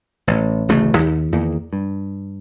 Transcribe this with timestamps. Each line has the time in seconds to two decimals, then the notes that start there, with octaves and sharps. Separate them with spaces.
0.27 A1
0.68 D1 A1 C#3 A3
0.98 D#2
1.32 E2 D#3 A#3
1.73 G2